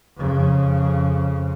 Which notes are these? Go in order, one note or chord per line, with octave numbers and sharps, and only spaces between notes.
F2 C#3